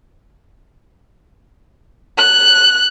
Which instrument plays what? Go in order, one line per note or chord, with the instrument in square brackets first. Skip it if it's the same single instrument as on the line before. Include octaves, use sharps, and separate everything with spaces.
[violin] F#6